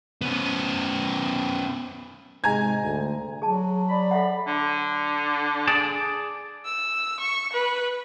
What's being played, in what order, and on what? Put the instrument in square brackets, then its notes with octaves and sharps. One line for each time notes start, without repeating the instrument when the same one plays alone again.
[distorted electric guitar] B3 C#4
[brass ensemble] G#2 C3 G#3 [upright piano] G#5 A#5 G#6
[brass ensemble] D2
[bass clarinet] F#3 [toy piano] G#4 A5
[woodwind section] D5 B5
[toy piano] A4 E5 F#5
[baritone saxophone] D3
[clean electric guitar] G#4 D5 A5
[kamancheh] E6
C#6
B4